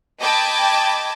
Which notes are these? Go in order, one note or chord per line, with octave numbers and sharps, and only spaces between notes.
D#5 G5 A5 B5 D6 G#6